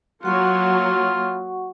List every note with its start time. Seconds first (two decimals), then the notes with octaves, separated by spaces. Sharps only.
0.23 F#3 A#3 F4 F#4 F#5 C#6